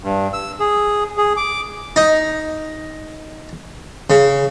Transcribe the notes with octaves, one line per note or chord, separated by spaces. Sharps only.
G2
E6
G#4
G#4
D6
D#4
C#3